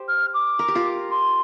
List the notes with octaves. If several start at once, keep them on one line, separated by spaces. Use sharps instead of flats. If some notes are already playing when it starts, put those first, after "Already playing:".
Already playing: G4 C5
F6
D6
A#4
G4
F4 A#4
C6